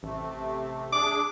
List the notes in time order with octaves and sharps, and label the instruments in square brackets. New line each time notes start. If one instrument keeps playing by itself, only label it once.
[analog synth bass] A1 [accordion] C3 A3
[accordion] D4 G#4 [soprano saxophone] D6